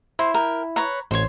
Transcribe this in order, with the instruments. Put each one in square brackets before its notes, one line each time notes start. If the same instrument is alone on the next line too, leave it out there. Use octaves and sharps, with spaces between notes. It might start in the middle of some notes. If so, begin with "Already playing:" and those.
[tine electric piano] E4 [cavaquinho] C5
[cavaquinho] A#4 G5
B4 C#5 A#5
[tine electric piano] A1 G#6 [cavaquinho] C5 C#5